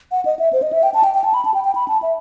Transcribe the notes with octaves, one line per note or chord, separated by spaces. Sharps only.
F#5
D#5
E5
C5
D#5
E5
G5
A5
G5
G5
A5
B5
A5
G5
G5
B5
A5
E5